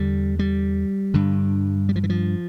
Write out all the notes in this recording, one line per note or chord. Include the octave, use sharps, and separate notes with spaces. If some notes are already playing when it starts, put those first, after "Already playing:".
Already playing: E2 D3 G3
G3
G2 D3
G3
F3
E3
F3